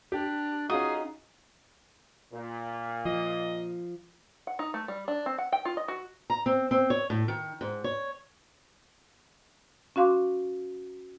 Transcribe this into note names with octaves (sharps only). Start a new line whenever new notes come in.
D4 G4
C#4 D#4 F4 F#4 G#4 D#6
A#2
F3 D#5
F#5
D#4
A3
G3
D4
C4
F#5
G5
F4
D#5
F#4
A#5
C4
C4
C#5
A2
D#3
G#2
C#5
C#4 F#4 F5 C6 D6